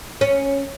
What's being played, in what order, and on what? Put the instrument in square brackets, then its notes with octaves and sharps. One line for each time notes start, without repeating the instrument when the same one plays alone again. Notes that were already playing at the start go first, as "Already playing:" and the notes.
[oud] C#4